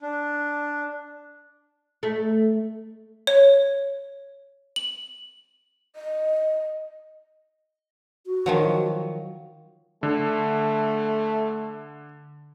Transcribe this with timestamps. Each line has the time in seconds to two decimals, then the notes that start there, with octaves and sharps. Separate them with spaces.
0.01 D4
2.03 A3
3.27 C#5
4.76 F#7
5.96 D#5
8.26 F#4
8.46 D#3 F3 F#3
10.03 D3 A3